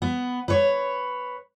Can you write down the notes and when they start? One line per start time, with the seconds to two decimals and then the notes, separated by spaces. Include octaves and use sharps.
0.02 B3
0.48 B4 C#5